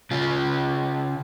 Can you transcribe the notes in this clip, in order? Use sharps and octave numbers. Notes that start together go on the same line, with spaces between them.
C#3 F4